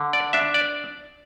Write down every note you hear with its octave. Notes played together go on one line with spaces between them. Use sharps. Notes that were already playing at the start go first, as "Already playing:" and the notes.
Already playing: D3
D5
D4 E5
D5